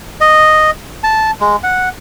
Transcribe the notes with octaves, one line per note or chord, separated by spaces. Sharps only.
D#5
A5
G#3
F#5